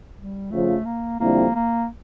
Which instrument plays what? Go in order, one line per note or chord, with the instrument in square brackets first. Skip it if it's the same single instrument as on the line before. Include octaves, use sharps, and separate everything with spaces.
[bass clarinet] G3
[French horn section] F2 C#3 F3 [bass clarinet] A3
[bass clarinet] A#3
[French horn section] F2 D3 G3 C4 E4 [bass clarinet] A#3
[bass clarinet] A#3